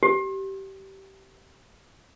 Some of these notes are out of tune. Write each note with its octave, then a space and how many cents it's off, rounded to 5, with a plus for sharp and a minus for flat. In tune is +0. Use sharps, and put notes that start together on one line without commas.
G4 -20